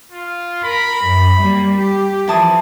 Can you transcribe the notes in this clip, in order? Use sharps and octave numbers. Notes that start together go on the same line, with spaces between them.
F4
A#4 B5
F#2
G3 A#3
G4
E3 F3 E4 A5 D#6